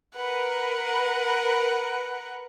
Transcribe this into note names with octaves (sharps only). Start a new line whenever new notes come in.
A#4 B4 F#5